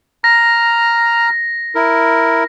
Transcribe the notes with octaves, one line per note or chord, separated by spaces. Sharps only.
A#5 F6 A#6
E4 A#4